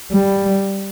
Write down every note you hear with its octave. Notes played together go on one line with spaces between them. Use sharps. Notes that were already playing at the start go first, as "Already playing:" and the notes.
G3